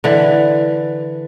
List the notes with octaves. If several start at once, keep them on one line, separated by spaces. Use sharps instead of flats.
D3 E3